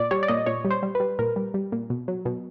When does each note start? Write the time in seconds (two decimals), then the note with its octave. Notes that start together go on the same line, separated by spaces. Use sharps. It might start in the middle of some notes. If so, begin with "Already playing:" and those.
Already playing: A#2 D5
0.11 G3 C#5
0.23 D5
0.28 A#2 D#5
0.46 A#2 C#5
0.65 G3
0.71 C5
0.83 G3
0.95 G3 B4
1.19 A#2 A#4
1.36 G3
1.54 G3
1.72 A#2
1.90 B2
2.08 F#3
2.25 B2